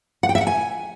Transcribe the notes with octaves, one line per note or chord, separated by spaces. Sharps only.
F#5
G5
E5
F#5
G#5